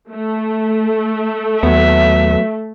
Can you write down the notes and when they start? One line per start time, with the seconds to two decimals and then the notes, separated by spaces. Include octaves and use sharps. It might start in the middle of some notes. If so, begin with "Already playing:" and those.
0.12 A3
1.63 D#2 F#3 B3 E5